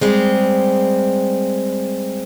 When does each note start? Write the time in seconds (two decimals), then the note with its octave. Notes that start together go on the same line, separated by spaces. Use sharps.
0.01 G3 G#3 C4